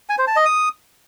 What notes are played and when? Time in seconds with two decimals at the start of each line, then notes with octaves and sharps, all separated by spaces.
0.09 G#5
0.18 C5
0.27 A5
0.36 D#5
0.45 D#6